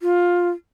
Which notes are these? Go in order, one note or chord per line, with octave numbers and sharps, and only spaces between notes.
F4